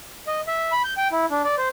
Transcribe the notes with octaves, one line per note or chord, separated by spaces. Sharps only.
D#5
E5
B5
G6
G5
E4
D4
D5
C5